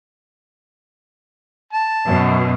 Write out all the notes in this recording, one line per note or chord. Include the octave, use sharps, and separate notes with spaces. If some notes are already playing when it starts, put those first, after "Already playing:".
A5
F#2 B2